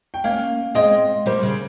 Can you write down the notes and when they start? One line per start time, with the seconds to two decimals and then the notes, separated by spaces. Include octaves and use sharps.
0.14 G5
0.24 A#3 C#4 F5
0.75 G#3 C4 D#5
1.26 G3 A#3 C5
1.43 C#3